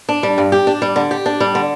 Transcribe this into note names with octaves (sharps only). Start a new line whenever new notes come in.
D4
G3
G2
G4
D4
G3
D3
G4
D4
G3
D3